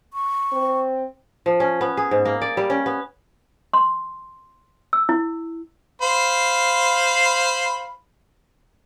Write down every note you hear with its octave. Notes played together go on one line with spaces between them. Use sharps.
C#6
C4
F3
C#4
B3
G#4
G#2
A#3
D5
G3
C#4
B3
C6
E6
E4
C5 F5 B5